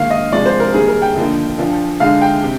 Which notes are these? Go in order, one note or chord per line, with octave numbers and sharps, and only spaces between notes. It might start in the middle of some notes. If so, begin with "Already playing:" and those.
Already playing: G#2 D#3 A#3 F5
D#5
C3 F3 G#3 D#4 D5
C5
A#4
D#3 G3 A#3 D#4 G#4
A#4
G5
D3 F3 A#3 D#4
A#2 F3 A#3 D4
D3 G#3 D#4 F5
G5
C3